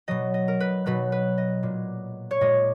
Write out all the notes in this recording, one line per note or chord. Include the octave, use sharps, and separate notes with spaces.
B2 F#3 D#5
D#5
A#4
B4
B2 F#3 B4
B4
D#5
A#2 G#3
C#5
A#2 G#3 D#5